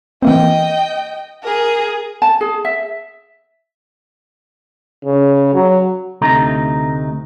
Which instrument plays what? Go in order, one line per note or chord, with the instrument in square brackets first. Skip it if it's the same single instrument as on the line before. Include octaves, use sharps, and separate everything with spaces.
[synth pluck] E3 A#3 C4 [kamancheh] D#5 G5
[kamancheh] G#4 A#4
[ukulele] A5
G#4
E5
[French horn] C#3
F#3
[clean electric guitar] D2 C3 A3 D#4 A#5